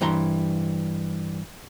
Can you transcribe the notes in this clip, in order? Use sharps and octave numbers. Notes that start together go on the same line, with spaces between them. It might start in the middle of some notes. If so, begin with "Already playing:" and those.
G2 E3 A#5 C6